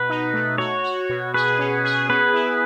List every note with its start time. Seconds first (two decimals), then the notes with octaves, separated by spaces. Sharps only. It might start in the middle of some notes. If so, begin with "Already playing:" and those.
Already playing: B2 B4
0.09 D#4
0.34 A3
0.58 F#4 C#5
0.84 F#4
1.09 B2
1.34 G#4 B4
1.59 C#4
1.85 G#4
2.09 B3 B4
2.34 E4